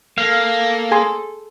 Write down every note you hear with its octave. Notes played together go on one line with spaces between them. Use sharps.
A#3 A4 F5
G#4 G#5 C6